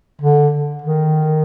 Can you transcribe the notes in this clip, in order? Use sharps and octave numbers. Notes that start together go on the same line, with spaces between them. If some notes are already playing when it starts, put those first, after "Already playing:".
D3
D#3